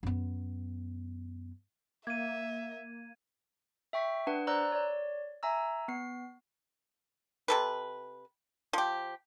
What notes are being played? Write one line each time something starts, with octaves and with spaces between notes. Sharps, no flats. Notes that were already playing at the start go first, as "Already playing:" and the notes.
F#2 B3
A#3 E5 G#6 D#7
E5 G5 C#6 B6
D4 B4 F#5
C5 D5 A#5 E6 F#6
C#5 D5
E5 G#5 A#5 E6
B3 C7
C3 A4 B4
F3 G4